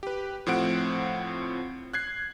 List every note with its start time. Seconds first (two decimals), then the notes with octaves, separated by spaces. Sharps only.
0.03 G4 B4
0.46 A2 F3 C4 F#5 D7
1.94 F#6 G#6 C7